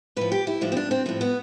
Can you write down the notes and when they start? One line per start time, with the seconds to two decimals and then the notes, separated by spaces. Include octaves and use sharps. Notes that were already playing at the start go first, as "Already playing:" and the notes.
0.16 A2 F3 B4
0.32 G4
0.47 E4
0.61 A2 F3 D4
0.72 C4
0.77 D4
0.91 C4
1.06 A2 F3 C4
1.21 B3